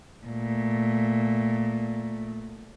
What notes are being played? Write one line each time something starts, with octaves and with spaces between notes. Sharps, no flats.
A#2 A3